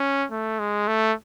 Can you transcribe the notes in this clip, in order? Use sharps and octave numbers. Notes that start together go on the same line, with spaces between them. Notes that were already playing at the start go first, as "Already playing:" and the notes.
Already playing: C#4
A3
G#3
A3